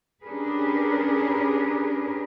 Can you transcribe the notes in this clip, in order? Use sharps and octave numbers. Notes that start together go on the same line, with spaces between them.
C#4 D4 G4 G#4 A#4 B4